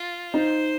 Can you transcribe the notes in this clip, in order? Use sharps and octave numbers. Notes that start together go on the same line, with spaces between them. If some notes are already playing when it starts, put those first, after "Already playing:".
Already playing: F4
D#4 C5